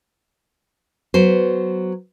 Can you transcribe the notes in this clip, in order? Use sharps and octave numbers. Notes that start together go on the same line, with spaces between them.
F#3 B3 C5